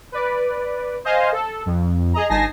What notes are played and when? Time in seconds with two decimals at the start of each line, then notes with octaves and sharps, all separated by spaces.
0.12 B4 D5
1.04 C5 D#5 F5 G#5
1.32 A4
1.66 F2
2.14 G#4 D#5 A#5
2.29 G1 D#4 G#5 A5 A#6 C7